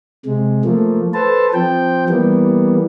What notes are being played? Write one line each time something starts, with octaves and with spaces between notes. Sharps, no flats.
C3 G#3
F3 A3 A#3
A4 B4 C5 A5
F3 C4 G5
E3 G3 A#3 B3